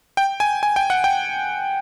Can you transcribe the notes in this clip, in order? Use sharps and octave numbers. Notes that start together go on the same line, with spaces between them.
G5
G#5
G#5
G5
F#5
G5